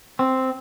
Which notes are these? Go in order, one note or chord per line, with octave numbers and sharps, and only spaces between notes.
C4